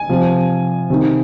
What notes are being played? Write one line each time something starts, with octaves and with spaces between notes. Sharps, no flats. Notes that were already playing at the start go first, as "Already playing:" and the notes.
Already playing: G#5
C3 F3
C3 D#3